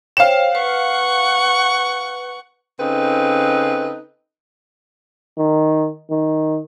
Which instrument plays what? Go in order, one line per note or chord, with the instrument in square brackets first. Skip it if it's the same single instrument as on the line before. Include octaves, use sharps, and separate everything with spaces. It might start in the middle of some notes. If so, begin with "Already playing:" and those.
[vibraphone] C5 C#5 G5 [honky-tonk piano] F5 E7
[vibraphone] B4 [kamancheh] F#5 C#6
[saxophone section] C#3 C4 D#4 A4 B4
[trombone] D#3
D#3